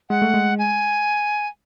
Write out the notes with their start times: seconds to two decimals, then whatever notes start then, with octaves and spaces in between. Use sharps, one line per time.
0.10 G#3 F#5
0.22 A3
0.34 G#3
0.59 G#5